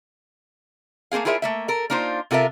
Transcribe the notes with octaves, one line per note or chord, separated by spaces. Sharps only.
A3 A#3 C4 G#4 F5
E4 F4 G#4 A#4 C#5 E5
A3 A#3 E5
A4 A#4
A#3 D4 D#4 F4 C5
C3 F4 A4 A#4 E5